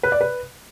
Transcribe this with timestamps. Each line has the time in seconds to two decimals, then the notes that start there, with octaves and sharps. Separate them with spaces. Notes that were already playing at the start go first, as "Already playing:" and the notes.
0.03 B4
0.12 D5
0.21 B4